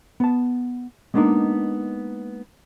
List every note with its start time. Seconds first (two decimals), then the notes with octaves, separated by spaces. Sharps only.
0.20 B3 A5
1.14 G#3 A#3 B3 D4 D#4 A#4